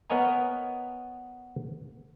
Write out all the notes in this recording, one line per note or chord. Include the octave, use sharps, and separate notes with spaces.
B3 A#4 C#5 D#5 G#5 A#5